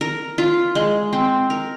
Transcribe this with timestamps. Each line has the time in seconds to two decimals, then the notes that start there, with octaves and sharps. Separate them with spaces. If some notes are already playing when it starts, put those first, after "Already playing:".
0.01 A#4
0.38 F4
0.75 G#3
1.13 C4
1.50 A#4